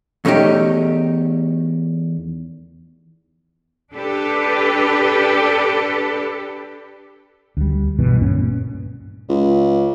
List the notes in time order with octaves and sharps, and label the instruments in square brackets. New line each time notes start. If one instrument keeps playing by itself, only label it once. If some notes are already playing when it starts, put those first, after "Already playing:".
[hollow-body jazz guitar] E2 A3 C#4 D#4 G4
[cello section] D4 G4 A4 B4
[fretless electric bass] D2 G3
C2 G2 B2 E3
D2 G2 A#2 C#4
[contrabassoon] C#2